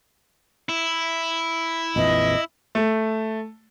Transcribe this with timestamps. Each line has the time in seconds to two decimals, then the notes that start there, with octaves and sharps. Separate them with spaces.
0.69 E4
1.96 A#1 F2 E3 D#5
2.75 A3